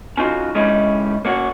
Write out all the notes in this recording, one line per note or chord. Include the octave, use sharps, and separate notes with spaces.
C#4 D#4 F4 F#4
C#3 G#3 C#4 D#4 E4
A#3 C#4 F#4